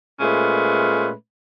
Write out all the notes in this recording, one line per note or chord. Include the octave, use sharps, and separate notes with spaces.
A#2 G#3 A3 C#4 B4 C5